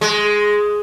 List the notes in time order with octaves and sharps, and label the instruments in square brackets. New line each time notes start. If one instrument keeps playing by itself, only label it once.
[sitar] G#3